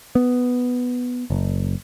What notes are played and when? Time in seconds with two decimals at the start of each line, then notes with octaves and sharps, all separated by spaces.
0.15 B3
1.30 F#1